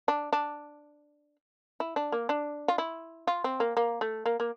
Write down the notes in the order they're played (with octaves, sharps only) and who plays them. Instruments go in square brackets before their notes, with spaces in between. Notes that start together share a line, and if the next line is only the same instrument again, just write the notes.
[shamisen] D4
D4
E4
D4
A#3
D4
F4
E4
F4
C4
A#3
A#3
A3
A#3
A#3